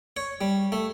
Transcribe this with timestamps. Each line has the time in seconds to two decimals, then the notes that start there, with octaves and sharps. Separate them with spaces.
0.17 C#5
0.41 G3
0.72 A3